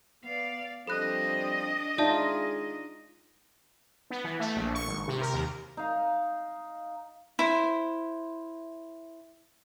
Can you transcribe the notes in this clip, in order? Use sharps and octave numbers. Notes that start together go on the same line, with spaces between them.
B3 D5 F5
F3 G3 C4 D4 A4 D#5 B5 F#6
G#3 D#4 F4 G#4 D5 E5 A5
B3
E3
A3
A#1
C#6
G#1
C3
A#4
D#2
D#4 F5
E4 C5